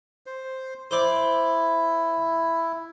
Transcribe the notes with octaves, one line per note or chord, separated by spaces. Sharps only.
C5
E4 C5 D5